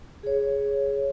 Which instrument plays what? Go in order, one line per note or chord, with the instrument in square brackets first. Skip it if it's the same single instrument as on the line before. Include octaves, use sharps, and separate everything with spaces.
[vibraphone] G#4 C#5